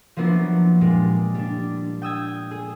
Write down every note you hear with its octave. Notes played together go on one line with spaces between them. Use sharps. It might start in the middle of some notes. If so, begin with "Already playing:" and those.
F3 F#3 A#3 B3 D4 E4
A#2 G3 G#3
G3 D4
G5 D#6 E6 G#6
G#4